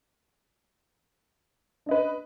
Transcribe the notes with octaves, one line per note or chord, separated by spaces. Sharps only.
D4 B4 D#5